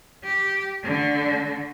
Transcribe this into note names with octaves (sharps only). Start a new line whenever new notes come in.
G4
D3 A3